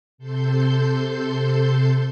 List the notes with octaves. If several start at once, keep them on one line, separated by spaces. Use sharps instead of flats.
C3 A4 C6 G6